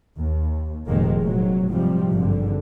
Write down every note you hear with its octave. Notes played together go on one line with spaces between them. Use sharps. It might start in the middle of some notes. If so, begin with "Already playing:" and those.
D#2
F1 F2 A#2 D#3 G#3 A#3
F1 A#2 F#3
G#2 C3 F3 G3
G#1 G2 D3